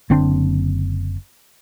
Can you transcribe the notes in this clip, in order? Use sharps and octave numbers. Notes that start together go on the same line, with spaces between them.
F#1 D3 C4 D4